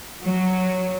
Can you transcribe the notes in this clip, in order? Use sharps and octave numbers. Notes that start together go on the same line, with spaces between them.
F#3